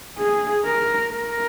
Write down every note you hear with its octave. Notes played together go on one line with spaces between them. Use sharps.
G#4
A#4
A#4